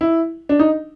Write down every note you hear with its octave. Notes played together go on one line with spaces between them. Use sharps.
E4
D4
D#4